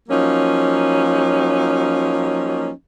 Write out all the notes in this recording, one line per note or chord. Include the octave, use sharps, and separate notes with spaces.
F3 F#3 A#3 C#4 D#4